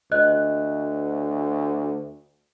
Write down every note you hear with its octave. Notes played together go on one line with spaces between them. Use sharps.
D2 D#5 F#6